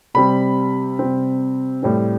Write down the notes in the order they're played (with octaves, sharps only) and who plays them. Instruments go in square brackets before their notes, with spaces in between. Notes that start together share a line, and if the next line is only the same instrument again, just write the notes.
[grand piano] C3 G3 C4 B5
C3 G3 C4
A2 G3 C4